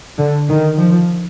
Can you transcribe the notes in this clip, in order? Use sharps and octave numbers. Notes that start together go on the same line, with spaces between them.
D3
D#3
F3